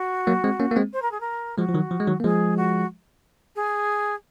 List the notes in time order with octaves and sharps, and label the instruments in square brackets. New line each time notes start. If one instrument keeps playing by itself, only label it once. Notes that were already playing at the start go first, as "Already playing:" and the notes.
Already playing: [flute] F#4
[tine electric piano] F#3 A#3
G#3 C4
A#3 C#4
A#3
G#3 C4
[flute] C5
A#4
G#4
A#4
[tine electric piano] F3 G#3 [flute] F#4
[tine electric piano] F3
D#3 F#3
F3
G#3
D#3 F#3
A#3
[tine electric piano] F3 G#3 [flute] G#4
[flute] F#4
G#4